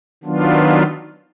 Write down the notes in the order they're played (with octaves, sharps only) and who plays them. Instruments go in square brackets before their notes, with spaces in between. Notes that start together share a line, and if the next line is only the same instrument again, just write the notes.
[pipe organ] D#3 F#3 B3 D4 F4